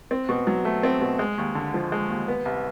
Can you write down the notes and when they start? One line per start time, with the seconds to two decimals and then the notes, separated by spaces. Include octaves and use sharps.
0.11 C4
0.29 B2
0.47 F#3
0.65 A3
0.83 C4
1.01 B2
1.19 G#3
1.38 D#2
1.55 D3
1.74 F3
1.92 G#3
2.09 D#2
2.28 B3
2.45 C2